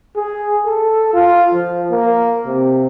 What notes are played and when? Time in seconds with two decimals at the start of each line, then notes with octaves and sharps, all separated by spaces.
0.16 G#4
0.66 A4
1.14 F4
1.54 F3
1.91 A#3
2.46 C3